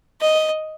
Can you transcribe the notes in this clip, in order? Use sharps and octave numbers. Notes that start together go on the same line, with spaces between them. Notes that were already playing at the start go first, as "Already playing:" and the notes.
D#5